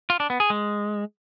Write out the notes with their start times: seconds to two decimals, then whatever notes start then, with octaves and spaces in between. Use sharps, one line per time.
0.10 F4
0.20 D4
0.30 B3
0.40 G#4
0.50 G#3